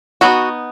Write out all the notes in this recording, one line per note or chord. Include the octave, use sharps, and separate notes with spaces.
F#3 B3 D#4 F#4